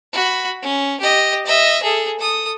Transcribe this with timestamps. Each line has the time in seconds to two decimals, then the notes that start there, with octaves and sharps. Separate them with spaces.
0.13 F#4 B5
0.62 C#4
1.01 G4 D#5
1.46 D#5 E5
1.83 G#4 A4
2.19 A4 D#6